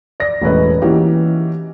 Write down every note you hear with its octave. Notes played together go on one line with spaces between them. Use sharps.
D5 A#6
E1 A2 C#4 B4 D#5
E3 A#3 C#4 D#4 F#4 G4